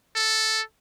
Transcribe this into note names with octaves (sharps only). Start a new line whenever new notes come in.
A4